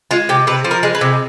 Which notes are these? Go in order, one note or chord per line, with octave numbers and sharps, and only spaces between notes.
G#3 F4
C3 G4
C3 B4
F3
A#4
G#3
B4
C3